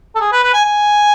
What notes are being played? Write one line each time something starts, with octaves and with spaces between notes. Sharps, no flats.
A4
G#4
B4
B4
G#5
G#5